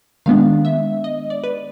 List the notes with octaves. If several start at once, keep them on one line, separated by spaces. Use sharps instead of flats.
D#3 G#3 B3 D4 F5
E5
D#5
D5
B4